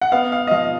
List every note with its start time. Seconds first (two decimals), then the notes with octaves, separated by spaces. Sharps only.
0.02 F#5
0.12 B3 F5
0.32 F5
0.47 D#5
0.51 F3 F5